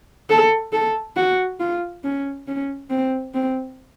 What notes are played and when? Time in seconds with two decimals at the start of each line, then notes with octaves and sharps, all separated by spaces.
0.30 A4
0.73 A4
1.16 F#4
1.60 F4
2.04 C#4
2.47 C#4
2.90 C4
3.34 C4